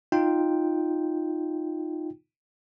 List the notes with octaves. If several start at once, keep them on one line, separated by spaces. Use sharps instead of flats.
D#4 F4 G5